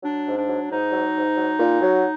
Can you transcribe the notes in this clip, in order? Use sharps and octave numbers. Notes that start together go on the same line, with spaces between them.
F#3 D4
G#2
D4
F#3
G#2 D#4
F#3
G#2
F#3
A#2
F#3